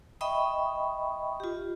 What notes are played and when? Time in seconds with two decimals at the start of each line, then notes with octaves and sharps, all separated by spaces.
0.21 D#5 E5 G5 B5 C#6 D#6
1.40 F4 G4